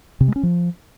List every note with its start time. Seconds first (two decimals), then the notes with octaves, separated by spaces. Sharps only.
0.21 C3
0.28 G#3
0.36 C#4
0.43 F3